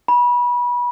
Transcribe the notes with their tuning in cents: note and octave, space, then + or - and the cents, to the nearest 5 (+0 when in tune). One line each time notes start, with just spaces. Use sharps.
B5 -25